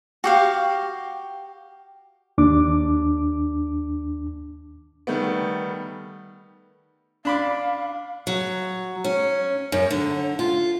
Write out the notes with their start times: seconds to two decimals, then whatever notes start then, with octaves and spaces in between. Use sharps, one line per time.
0.24 F#4 G4 F5
2.38 D#2 D4 D6
5.07 D#3 G3 A3 B3
7.25 D4 F5 B5 D6
8.27 F#3
9.04 C#4
9.72 F#2
9.91 D3
10.39 F4